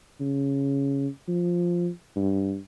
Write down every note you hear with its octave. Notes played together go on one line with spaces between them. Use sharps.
C#3
F3
G2